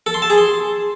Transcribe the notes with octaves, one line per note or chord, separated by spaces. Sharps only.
A4
C6
A5
G#4
C6